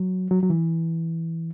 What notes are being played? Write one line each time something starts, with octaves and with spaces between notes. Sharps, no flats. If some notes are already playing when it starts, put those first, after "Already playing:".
Already playing: F#3
F#3
F#3
E3